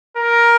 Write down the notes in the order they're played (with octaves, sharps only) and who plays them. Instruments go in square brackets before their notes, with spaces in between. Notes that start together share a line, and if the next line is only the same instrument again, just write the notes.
[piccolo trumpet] A#4